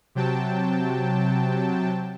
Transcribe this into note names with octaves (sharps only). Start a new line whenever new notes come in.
C3 F#3 G5 A5